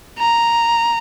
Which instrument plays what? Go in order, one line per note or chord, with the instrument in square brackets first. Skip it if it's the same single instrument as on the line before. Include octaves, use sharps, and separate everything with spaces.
[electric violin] A#5